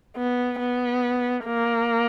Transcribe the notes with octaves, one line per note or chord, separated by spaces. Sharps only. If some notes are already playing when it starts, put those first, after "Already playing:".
B3
B3
A#3